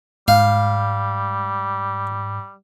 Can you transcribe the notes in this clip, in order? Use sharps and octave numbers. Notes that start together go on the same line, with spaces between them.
G#2 G3 F5